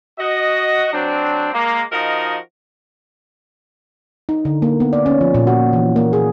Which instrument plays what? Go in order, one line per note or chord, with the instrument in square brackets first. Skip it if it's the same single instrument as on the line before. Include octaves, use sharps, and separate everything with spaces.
[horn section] F#4 D#5
F#3 C4 D4
G#3 A#3
F3 D#4 F#4 A#4 D#5 F5
[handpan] D#4
D3
A#3
B3
D5
C#4
F3
A#2
F#4
E3
A#3
G#4